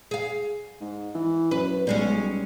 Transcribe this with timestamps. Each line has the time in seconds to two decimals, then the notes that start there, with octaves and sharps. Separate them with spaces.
0.11 G#4 F5
0.81 G#2
1.15 E3
1.51 F#2 B4
1.87 B1 G3 G#3 C#4